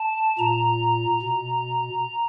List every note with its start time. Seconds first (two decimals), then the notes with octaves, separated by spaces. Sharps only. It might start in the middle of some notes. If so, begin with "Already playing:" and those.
Already playing: A5
0.39 A#2 A#5
1.22 B2